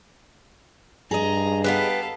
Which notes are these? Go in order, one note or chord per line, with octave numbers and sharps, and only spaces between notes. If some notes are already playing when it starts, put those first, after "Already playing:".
G2 G#4 D#5 A#5
B3 G4 A4 B4 F5